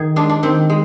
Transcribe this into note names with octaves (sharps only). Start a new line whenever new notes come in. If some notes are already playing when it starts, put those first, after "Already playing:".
Already playing: D#3 G#4
G#3 D4
D4
D#3 C4
G#3